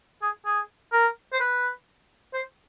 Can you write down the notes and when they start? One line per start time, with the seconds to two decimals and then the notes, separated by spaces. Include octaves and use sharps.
0.22 G#4
0.46 G#4
0.93 A#4
1.33 C5
1.40 B4
2.34 C5